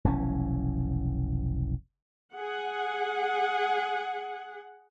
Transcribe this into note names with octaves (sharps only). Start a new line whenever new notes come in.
F1 B1 E3 C#4
G#4 F#5